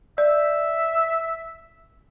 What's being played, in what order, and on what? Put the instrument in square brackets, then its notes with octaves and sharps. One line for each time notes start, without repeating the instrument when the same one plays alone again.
[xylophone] D5 [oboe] E5